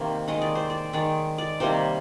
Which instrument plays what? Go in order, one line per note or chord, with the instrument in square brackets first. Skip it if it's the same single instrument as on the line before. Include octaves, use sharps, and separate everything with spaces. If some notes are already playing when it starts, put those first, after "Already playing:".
Already playing: [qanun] C3 D#3 A#3 C5
D#3 G#3 D#5
D5
C5
D5
D#3 G#3 D5
D5
C3 D#3 G3 A#3 C5